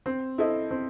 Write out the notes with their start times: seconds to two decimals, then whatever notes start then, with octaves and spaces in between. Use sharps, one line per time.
0.06 C4
0.38 E4 A4 C5 D#5
0.71 C4